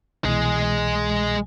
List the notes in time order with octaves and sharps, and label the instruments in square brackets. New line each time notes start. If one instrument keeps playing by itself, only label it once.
[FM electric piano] C2 B2 E3 [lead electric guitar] G#3 G#4